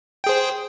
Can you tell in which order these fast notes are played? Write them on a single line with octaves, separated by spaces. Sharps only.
G5 G#4 C5